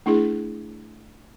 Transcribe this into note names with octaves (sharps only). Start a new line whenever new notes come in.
A3 D4 E4 G#4